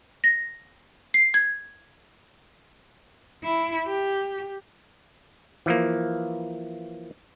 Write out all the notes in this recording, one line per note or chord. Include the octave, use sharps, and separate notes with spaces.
A#6
C7
G#6
E4
G4
E3 F3 A#3